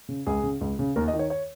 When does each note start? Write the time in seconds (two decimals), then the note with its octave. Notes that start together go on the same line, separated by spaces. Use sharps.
0.09 C#3
0.27 C#2 G#4
0.43 C#3
0.61 C#2
0.79 C#3
0.96 D#2 A#4
1.08 D#5
1.14 D#3
1.19 C#5
1.30 C#5